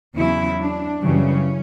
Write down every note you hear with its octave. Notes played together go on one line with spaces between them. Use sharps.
E2 C#3 F#3 E4
D4
F#2 C#3 E3 G3 C#4